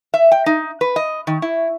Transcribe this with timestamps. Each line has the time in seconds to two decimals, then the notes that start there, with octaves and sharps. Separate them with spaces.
0.14 E5
0.32 G5
0.46 D#4
0.81 B4
0.96 D#5
1.27 D#3
1.42 E4